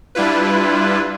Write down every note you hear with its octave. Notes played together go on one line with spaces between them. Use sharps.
G3 D4 E4 F4 B4